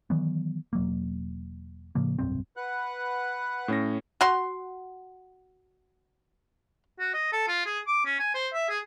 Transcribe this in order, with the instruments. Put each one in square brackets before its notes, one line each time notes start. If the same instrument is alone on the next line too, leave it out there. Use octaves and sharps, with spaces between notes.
[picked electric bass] D#3 E3 F#3 B3
E1 F#3 A#3
A2 C#3 F3 A#3
F1 B1 G2 C4
[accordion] B4 F#5 F#6
[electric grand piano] A2 C#4 A#6
[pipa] F#4 C6
[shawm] F#4
D#5
A4
F4
G#4
D6
C#4
G#5
C5
E5
G#4